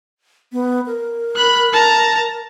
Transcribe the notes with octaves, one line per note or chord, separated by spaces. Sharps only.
B3
A#4
B5 F#6
A5 A#5